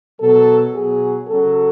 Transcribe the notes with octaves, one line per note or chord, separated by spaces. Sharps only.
B2 F#3 A4
B2 F#3 G#4
C#3 F#3 A4